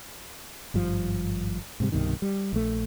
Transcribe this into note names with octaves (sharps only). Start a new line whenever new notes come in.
G#1 G2 F3
G#2 C3 G3
C2 G2 B2 D#3
G3
A#1 A3